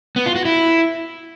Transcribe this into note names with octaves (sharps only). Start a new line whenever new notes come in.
B3
F4
F#4
E4